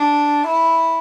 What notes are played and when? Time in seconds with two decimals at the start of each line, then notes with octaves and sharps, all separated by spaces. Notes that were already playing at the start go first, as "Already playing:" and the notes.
Already playing: D4
0.47 E4